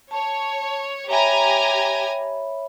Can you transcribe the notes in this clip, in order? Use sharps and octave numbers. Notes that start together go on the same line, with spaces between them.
C#5 A5
G4 C#5 E5 G#5 A#5 B5